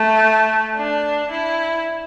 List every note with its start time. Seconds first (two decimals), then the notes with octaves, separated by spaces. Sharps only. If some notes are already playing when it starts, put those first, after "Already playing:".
Already playing: A3
0.76 D4
1.31 E4